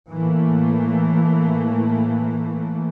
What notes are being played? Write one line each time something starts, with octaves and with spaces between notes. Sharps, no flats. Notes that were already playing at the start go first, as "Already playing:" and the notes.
A2 E3 A3 A#3